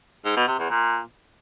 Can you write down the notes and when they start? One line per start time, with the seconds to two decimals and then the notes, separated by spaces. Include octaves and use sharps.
0.25 G#2
0.36 B2
0.47 C3
0.59 E2
0.70 A#2